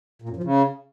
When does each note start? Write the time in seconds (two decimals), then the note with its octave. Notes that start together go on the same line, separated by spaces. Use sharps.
0.22 A#2
0.29 F#2
0.36 F3
0.44 C#3